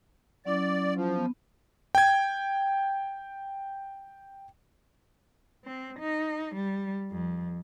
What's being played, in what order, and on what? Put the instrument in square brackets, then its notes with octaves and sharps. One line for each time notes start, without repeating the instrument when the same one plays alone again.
[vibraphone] F#3 C#4 E4 [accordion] D5
[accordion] F3
[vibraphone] B3
[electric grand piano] G5 G#6
[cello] C4
D#4
G3
F2